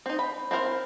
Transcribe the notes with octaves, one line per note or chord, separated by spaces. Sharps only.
C4 D#4
B5
C4 E4 A#4 C5